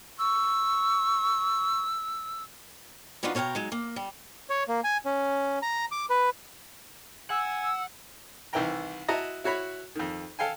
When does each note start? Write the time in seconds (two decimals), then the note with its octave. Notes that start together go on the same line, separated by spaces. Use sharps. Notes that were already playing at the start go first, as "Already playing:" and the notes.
0.19 C#6 E6
3.23 F3 B3 D4 D#4 F4 F#4
3.35 B2 C#5 F5 G5 A#5
3.55 F#3 G#3 D#4
3.72 A#3
3.96 G3
4.50 C#5
4.68 A#3
4.84 G#5
5.05 C#4
5.62 A#5
5.92 D6
6.10 B4
7.30 F#5 G#5 E6
8.53 C2 D#3 E3 E5 G5 A#5
9.08 E4 F#4 D#5 A5 A#5
9.44 E4 F#4 C#5 B5
9.95 F2 D#3
10.39 A4 F5 G5 G#5